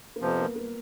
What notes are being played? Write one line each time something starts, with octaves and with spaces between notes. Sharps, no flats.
A#3
F2 C3 F3 B3
A#3
A#3